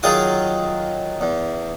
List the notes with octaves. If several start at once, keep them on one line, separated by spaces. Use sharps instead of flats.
D#3 F#3 F4 G#4 D6 D#6
E2